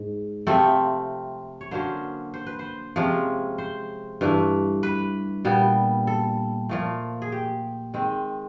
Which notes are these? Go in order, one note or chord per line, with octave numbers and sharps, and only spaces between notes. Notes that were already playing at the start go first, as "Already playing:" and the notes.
Already playing: G#2
C3 F3 A3 C4 A4
C#5
D3 F#3 A#3 C#4 C5
C5
B4
C5
C3 F3 G#3 C#4
C5
G2 E3 A3
B4
A#2 G3 B3
A4
A#2 F3 A3
G#4
G4
D#3 G#3 C4